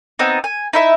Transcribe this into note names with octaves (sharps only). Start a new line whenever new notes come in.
B3 C4 D#4
G#5
D#4 E4 E5